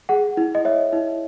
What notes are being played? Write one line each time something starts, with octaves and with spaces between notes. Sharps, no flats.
G#4 F#5
E4
D#5
C#5 E5
E4